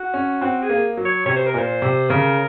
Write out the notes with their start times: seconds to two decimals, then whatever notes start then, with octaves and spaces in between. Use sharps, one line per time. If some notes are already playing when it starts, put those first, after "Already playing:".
Already playing: F#4
0.14 C#4
0.41 C4 F#4
0.62 G#4
0.70 A#3
0.97 F#3
1.05 C#5
1.26 C3 C#5
1.36 C5
1.47 A#4
1.54 A#2 C5
1.82 C3
2.10 C#3 A#4